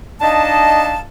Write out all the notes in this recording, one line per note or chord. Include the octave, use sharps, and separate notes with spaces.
D4 D#4 D#5 F5 A5